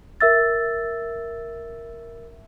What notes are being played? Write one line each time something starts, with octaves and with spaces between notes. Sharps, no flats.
A#4 E5 E6 A6